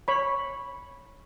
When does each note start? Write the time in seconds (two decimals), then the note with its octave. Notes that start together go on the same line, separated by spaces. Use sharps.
0.08 C#5 B5